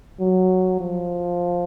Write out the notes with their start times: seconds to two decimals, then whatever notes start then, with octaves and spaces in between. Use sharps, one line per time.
0.20 F#3
0.80 F3